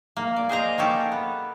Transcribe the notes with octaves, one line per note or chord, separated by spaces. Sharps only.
A#3
D5
G#4 C5 D#5 A#5
A#3 C#4 G4 A4
B3